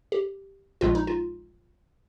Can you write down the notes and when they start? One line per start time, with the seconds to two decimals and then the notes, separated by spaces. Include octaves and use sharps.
0.12 G4
0.81 A#1 A#2 G#3 F4
0.95 D#4
1.07 F4